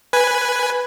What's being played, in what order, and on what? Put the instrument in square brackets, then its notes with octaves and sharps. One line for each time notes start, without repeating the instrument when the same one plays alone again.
[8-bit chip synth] B4 G#5